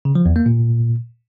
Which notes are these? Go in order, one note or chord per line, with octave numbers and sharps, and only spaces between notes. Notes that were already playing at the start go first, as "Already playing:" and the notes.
C#3
F3
E2
A#3
A#2